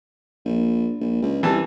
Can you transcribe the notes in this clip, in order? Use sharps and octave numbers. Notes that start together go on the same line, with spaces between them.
A#1
A#1
C#2
C2 E3 G3 A5